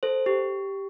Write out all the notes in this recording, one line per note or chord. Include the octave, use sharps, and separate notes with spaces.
A4 C5
G4